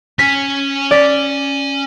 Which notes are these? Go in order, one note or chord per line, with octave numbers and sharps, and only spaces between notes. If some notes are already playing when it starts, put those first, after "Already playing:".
C#4 G#5 B6
D5 B6